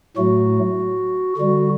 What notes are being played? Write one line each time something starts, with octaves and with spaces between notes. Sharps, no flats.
A2 F#3 A3 F#4
D3 G3 F#4